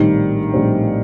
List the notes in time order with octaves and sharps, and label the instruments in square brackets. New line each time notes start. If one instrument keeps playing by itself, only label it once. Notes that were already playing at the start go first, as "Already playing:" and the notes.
Already playing: [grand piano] A#1 A2 G3 C4 [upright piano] D#3
[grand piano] A#1 A2 G3 C4